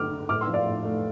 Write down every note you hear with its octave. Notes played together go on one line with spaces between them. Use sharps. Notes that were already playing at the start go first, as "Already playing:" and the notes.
Already playing: D3 A3 D6 F6
D3
A2 D6 F6
C6 E6
F3
D5 F5
A2
A3